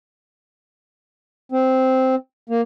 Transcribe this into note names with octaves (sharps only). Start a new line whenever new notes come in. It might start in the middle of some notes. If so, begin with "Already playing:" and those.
C4
A#3